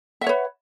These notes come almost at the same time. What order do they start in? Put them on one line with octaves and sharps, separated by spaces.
E5 F#5 C#5 B4